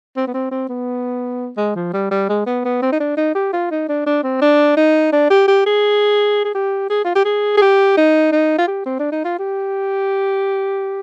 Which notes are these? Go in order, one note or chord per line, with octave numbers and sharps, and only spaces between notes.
C4
B3
C4
C4
B3
G#3
F3
G3
G3
G#3
B3
B3
C4
D#4
D4
D#4
G4
F4
D#4
D4
D4
C4
D4
D#4
D4
G4
G4
G#4
G#4
G4
G#4
F4
G4
G#4
G#4
G4
D#4
D#4
F4
G4
C4
D4
D#4
F4
G4